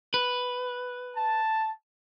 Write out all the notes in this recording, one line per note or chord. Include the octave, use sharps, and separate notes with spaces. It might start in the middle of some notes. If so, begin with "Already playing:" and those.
B4
A5